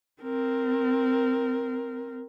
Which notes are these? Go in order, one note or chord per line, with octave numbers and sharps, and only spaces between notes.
C4 A#4